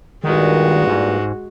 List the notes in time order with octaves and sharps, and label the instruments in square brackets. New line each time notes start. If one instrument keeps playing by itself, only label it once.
[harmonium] G2 A#2 [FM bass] D#3 [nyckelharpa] G#3 F#4
[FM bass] G#2